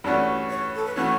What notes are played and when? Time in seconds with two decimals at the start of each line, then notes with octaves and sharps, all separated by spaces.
0.04 G2 E3 A3 C#4 F#4 D5
0.50 C#5
0.76 A4
0.85 B4
0.96 E3 A3 C#4 F#4 C#5